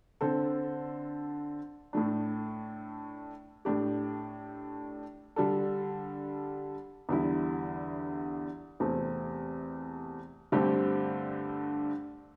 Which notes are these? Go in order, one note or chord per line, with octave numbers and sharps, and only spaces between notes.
D3 C4 A4
A2 A3 D4
A2 A3 D4 G4
D3 G3 D4 A4
E2 D3 G3 E4
E2 C3 A3 C4
G2 D3 A3 C4 G4